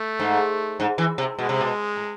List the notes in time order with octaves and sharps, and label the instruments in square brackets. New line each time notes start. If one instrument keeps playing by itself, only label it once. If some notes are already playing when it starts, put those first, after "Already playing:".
Already playing: [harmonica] A3
[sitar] G#2
G#2
E3
C3
[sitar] B2 [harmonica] G#3
[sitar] C3
B2
A2